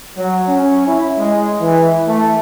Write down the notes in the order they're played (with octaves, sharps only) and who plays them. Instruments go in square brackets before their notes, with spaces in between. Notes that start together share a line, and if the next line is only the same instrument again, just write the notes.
[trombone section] F#3
C#4
E4
G#3
E3
A3